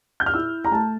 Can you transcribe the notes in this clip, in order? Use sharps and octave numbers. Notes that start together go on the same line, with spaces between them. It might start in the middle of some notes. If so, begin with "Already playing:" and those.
G6
F6
E4 E6
A#5
A3 A5